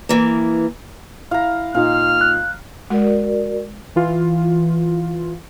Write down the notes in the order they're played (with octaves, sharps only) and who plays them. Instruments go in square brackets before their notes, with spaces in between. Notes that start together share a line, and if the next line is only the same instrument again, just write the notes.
[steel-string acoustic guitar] E3 A#3
[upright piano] E4 [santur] F5 A#5
[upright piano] A#2 D#4 [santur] F5 [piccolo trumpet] F6
[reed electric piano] F#6
[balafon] G#3 [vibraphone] F#4 A#4 D5
[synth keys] E3 F4